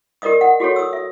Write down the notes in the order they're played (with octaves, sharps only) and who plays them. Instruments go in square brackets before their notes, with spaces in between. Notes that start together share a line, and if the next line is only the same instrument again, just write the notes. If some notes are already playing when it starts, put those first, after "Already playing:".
[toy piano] G4 A#4 D5 D#5 D#6
F#5
F#4 G4 A4 C#5
D#6 E6
E5